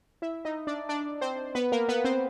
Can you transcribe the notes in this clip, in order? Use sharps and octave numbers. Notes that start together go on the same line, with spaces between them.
E4 E5
D#4 D#5
D4 D5
D4 D5
C4 C5
B3 B4
A#3 A#4
B3 B4
C4 C5